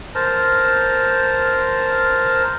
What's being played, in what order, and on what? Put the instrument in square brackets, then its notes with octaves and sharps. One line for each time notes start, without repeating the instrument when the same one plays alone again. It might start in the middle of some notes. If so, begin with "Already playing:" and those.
[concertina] A#4 C5 A5 A#5